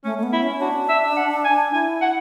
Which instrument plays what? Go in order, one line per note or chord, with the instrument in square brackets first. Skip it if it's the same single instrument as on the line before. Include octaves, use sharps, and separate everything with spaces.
[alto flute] A3 [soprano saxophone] C#4
[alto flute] A3
B3
[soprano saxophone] E4
[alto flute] C#4
[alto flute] D4 [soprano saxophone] F#4
[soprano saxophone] E5
F#5
G#5
[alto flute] E4 [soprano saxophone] G#5
[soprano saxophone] F#5